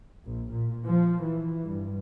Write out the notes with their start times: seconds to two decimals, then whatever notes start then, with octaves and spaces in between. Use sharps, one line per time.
0.23 A#1
0.52 A#2
0.86 F3
1.24 E3
1.64 G2